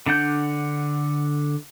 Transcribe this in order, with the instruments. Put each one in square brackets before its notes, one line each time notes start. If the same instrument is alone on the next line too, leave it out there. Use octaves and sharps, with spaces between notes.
[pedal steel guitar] D3 D4 F#5 G6